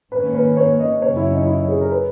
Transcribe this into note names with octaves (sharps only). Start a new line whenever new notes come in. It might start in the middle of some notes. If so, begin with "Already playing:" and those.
G#2 D#3 A#3 C#4 B4
B4
C#5
D#5
F#2 C#3 F#3 C#4 C#5
E4
D#4
E4
G#4
A#4
B4